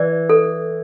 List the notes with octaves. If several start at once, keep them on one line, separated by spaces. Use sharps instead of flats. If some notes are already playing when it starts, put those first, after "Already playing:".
Already playing: E3 D5
A4